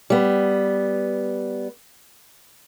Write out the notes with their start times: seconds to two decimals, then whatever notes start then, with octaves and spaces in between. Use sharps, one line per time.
0.10 G3 B3